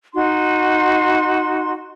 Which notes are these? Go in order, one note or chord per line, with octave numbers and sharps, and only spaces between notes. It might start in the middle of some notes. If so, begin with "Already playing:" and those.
D#4 F#4 C6